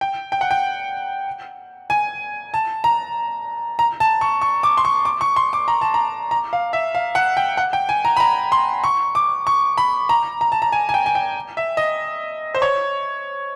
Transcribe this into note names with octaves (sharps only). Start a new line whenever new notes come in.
G5
G5
F#5
G5
G#5
A5
A#5
A#5
A5
C#6
C#6
D6
C6
C#6
D6
C#6
C6
D6
A#5
A5
A#5
A#5
F5
E5
F5
F#5
G5
F#5
G5
G#5
A#5
B5
A#5
C6
C#6
D6
C#6
B5
A#5
A#5
A5
A#5
G#5
G#5
G5
G#5
G5
E5
D#5
C5
C#5